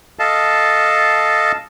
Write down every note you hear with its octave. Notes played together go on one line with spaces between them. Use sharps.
A4 D#5 F5 A5